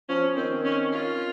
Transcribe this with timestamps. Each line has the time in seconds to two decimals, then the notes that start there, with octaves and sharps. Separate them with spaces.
0.09 F3 C#4
0.36 D#3 C4
0.65 C#4
0.92 F4